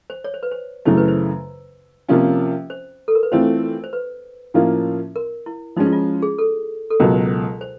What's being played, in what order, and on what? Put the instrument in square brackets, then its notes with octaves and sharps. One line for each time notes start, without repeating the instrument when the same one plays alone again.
[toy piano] C5
C#5
C5
B4
C5
[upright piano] F#2 C#3 E3 A3 [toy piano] C5
[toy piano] B4
C5
[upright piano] C3 F3 A#3 C#4 F4
[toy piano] C5
A4
A#4
B4
[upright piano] E3 A3 C4 F4 [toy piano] C5
[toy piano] C5
B4
[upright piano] A2 F3 A#3 C#4 F4
[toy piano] A#4
E4
[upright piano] F3 G#3 C#4 [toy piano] D#4
[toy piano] E4
F4
G#4
A4
A4
[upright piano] C#2 B2 F#3 [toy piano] A#4
[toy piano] C5